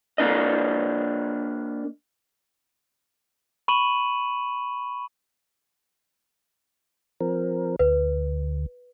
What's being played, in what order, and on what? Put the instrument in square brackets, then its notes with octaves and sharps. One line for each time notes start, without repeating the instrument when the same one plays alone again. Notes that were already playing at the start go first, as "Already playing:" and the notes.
[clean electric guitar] A#3 D4 D#5
[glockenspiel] B5 C#6 D#7 E7 F#7
[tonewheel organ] F3 C4 A#4
[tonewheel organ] D2 [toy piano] B4